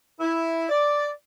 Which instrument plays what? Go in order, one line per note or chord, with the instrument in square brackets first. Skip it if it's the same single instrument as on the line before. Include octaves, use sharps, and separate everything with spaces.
[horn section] E4
D5